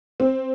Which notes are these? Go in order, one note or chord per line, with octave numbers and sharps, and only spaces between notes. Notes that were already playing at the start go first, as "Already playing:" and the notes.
C4